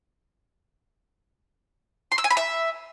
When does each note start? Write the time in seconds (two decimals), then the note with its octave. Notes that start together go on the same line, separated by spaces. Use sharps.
2.12 C6
2.18 E6
2.24 G#5
2.31 B5
2.37 E5